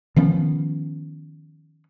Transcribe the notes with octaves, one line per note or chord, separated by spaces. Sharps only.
D#3 F3 B3 C#4